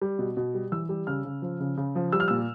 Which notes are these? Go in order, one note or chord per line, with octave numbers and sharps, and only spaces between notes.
G3
B2
B2
G3
E3 E6
G3
C#3 F6
C#3
F3
C#3
C#3
F3
G3 E6
F6
A#2 E6